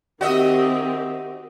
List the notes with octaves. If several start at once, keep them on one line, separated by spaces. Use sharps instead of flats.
D#3 C4 F#4 G4 D#5 E5